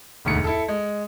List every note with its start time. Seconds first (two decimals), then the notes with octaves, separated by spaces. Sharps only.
0.25 E1 D2 G#2 C#7
0.44 E4 A4
0.68 G#3